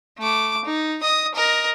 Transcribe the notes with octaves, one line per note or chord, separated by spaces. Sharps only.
A3 D6
D#4
D#5 D#6
A#4 D#5